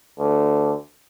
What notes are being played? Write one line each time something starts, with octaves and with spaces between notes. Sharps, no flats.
D2